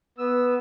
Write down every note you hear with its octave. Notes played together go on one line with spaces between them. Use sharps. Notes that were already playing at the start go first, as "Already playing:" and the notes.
B3 E6